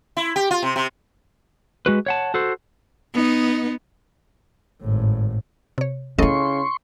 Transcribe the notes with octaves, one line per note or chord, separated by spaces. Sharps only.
E4
G4
F4
C3
C3
G#3 F#4 B4
C#5 F#5 A5
F#4 A4 C5
B3 D#4
G#1 A2
C3 C#5
C#3 C#4 E4 A4 D#5 C6 C#6